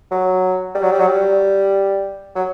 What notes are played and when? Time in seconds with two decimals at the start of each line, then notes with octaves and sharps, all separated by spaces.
0.11 F#3
0.75 G3
0.83 F#3
0.91 G3
0.99 F#3
1.07 G3
2.35 F#3